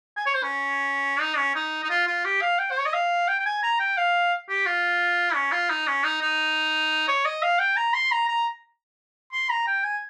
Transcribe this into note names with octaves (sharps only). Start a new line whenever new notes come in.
G#5
C#5
C5
C#4
D#4
C#4
D#4
D#4
F4
F4
G4
F5
G5
C5
C#5
D#5
F5
G5
G5
G#5
A#5
G5
F5
G4
F4
C#4
F4
D#4
C#4
D#4
D#4
C#5
D#5
F5
G5
A#5
C6
A#5
A#5
C6
A#5
G5
G#5